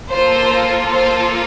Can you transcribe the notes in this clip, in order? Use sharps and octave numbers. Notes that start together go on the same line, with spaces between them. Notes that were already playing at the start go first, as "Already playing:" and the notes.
A#3 F4 A4 C5
C5